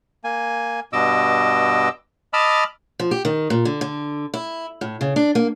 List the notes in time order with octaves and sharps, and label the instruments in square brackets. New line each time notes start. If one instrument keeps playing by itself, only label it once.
[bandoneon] A#3 G#5
G2 B2 D#5 D6 E6
D#5 A5 B5 D6 E6 F6
[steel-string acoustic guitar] F3
G4
D#3
A#2
D3
D3
E4
A2
C#3
D4
A#3